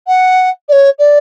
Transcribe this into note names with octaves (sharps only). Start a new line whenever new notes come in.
F#5
D5
C#5
D5